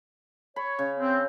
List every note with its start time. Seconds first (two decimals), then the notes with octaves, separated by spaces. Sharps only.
0.56 C#5 B5
0.79 C#3
0.98 C4